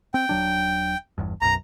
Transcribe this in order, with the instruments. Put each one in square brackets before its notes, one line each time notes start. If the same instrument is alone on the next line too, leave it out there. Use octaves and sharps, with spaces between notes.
[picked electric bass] C4 [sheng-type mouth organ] G5
[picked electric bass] D#1 F#3 D4
G1 E2 G2
[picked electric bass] B1 F#2 [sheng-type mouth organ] A#5